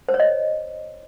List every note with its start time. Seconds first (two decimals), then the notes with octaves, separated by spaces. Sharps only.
0.09 C5
0.14 C#5
0.20 D#5